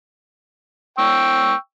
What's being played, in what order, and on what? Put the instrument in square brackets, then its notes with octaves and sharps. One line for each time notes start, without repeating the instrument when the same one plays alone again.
[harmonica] G5 C#6 E6